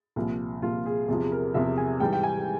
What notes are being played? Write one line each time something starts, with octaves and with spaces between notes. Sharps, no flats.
C2 A#2 F3
C2 A#2 F3 F4
G#4
E2 C3 F3 G#4
A#4
E2 C3 F3 E5
G#5
G#2 E3 G3 G5
G5
G#5